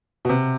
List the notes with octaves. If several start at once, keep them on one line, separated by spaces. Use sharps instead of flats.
B2
C3